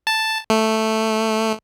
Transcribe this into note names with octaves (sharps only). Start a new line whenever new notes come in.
A5
A3